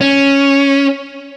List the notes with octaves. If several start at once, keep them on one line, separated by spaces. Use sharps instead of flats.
C#4